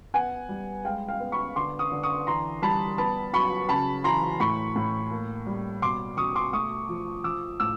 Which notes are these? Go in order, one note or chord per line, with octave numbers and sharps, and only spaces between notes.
B3 F#5 G#5
G3
G#3 F5 G5
F5 G5
B3
B5 C#6
D3 C6 D6
C#6 D#6
D3
C#6 D#6
E3 A#5 C6
G3 A5 B5
B3 A5 B5
F#3 B5 C#6
C#3 A5 B5
E3 A#5 C6
A2 B5 C#6
A2
A#3
G3
B2 C6 D6
B2 C#6 D#6
C6 D6
A3 C#6 D#6
F3
F3 D6 E6
A2 D6 E6